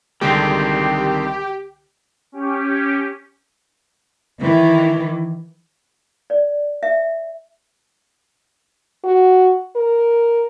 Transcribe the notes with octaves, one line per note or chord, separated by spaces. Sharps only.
C2 D3 D#3 G#3 C4 G4
C#4 G4
D#3 E3
D5
E5
F#4
A#4